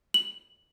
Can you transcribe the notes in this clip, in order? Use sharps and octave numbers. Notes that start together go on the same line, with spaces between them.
F#7